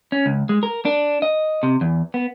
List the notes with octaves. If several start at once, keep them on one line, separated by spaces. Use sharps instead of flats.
C#4
C#2
G#3
A#4
D4
D#5
C3
E2
B3